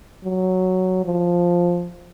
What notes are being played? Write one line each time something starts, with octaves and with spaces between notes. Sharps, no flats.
F#3
F3